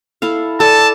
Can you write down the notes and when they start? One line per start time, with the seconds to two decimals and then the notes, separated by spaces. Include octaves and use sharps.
0.22 E4 A4 F5
0.60 A4 D5 G#5 A5